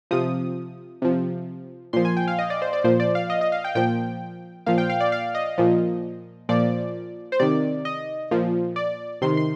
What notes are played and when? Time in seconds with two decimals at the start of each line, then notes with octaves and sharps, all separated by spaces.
0.11 C3 F3 D#6
1.02 C3 F3
1.93 A#2 F3 C6
2.05 G#5
2.17 G5
2.28 F5
2.39 D#5
2.50 D5
2.62 C5
2.73 D5
2.84 A#2 F3 C5
3.00 D5
3.15 F5
3.30 D#5
3.41 D#5
3.52 F5
3.64 G5
3.75 A#2 F3 G5
4.66 A#2 F3 F5
4.78 G5
4.90 F5
5.00 D5
5.12 F5
5.35 D#5
5.58 A#2 F3
6.49 A#2 F3 D5
7.32 C5
7.40 C3 D#3 D5
7.85 D#5
8.31 A#2 F3
8.76 D5
9.22 C3 D#3 C6
9.37 C6